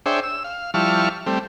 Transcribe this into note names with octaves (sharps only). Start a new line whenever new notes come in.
D4 G#4 C5 C#5 E5 G5
E6
F5
F3 G3 E4 A5 C#6 F6
G3 A3 C4